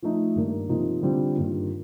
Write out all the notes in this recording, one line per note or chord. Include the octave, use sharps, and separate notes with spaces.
F3 A3 D#4
G2 D#3 A#3 D4
C3 F3 A#3 D#4
D3 G3 C4 F4
G2 D#3 A#3 F4